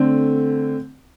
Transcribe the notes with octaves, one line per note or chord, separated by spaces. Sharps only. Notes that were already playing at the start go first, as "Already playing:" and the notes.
Already playing: D3 A3 C4